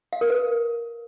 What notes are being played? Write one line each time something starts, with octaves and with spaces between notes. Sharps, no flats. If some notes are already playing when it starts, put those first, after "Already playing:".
F5
A#4
B4